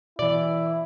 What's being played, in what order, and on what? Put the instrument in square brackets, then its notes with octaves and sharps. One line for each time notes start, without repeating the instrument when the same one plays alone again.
[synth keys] B2 E3 [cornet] E4 [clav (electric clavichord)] D5